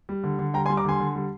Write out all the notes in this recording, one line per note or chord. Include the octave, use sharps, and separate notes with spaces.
G3
D3
D3
G3 G5 A#5
G#5 C6
G3
A#5 D6
D3 G#5 C6
D3
G3